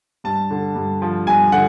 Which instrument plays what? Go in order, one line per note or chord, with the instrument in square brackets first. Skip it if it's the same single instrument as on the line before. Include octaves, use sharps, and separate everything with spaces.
[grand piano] G2 A5
D3
G2
F3
G2 G#5
D3 F#5